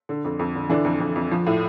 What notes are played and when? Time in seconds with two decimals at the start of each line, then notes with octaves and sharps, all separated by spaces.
0.09 D3
0.25 F2
0.39 F2
0.55 D3
0.69 D3 E3 D4
0.85 F2
1.00 F2
1.16 F2
1.31 F3
1.47 A2